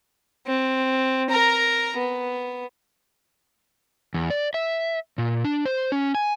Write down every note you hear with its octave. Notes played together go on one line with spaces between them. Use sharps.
C4
A#4 A#5
B3
E2
D5
E5
A#2
D4
C5
C#4
G#5